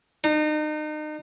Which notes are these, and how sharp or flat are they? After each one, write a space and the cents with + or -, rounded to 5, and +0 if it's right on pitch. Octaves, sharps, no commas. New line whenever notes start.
D#4 -35